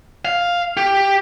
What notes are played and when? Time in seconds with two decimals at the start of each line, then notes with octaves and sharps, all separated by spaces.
0.25 F5
0.77 G4